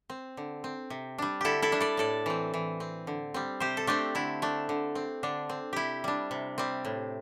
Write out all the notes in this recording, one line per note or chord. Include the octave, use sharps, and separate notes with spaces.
C4
D3
C4
C3
G3 D4
D3 E4 G4 A4
E4 A4
G3 D4
A4 D5
A2 A4 D5
E3 C4
E3
C4
D3
G3 C4
C3 G4 C5
A4
A3 C4 D4 G4
D3 E4
A3 D4
D3
C4
D3 D4
C4
C3 E4 G4
G3 D4
C3
G3 C4
A2